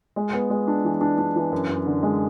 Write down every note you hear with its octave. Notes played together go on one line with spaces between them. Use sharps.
G#3
B3
G#3
D4
E3
D4
D4
E3
F#2
F#2
D3
G#3